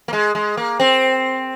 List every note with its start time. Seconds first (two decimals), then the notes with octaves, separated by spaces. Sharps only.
0.08 A#3
0.13 G#3
0.35 G#3
0.57 A#3
0.80 C4